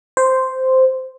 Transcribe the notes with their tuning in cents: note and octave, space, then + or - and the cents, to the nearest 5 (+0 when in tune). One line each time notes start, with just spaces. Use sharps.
C5 -5